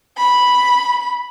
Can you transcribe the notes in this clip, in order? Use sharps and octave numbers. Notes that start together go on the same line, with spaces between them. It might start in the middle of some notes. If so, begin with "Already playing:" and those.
B5